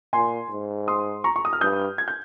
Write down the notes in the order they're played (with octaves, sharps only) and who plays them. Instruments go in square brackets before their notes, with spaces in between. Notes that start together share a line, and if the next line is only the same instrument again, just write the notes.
[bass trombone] A#2 [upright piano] G#5 C6
[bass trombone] G#2
[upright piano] C6 D#6
A#5 C#6
C#6
D#6
F6
[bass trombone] G2 [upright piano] D#6 G6
[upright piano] G#6
G6